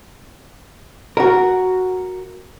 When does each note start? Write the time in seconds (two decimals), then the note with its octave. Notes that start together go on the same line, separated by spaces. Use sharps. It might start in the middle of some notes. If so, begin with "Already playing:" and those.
1.17 F#4 A#4